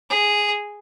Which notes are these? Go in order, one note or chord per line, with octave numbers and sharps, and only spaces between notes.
G#4